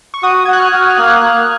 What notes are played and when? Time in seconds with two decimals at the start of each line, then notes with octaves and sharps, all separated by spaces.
0.14 C#6
0.23 F#4 D#6
0.45 F#4 G#6
0.53 F#6
0.60 F6
0.72 F#4
0.83 D#6
0.90 F6
0.97 A#3 F#6
1.21 A#3 F#6